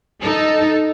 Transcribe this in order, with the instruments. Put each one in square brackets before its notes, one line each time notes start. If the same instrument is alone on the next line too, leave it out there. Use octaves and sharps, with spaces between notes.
[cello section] D#4 A4